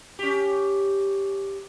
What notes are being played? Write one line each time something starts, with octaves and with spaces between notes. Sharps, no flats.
C#4 G4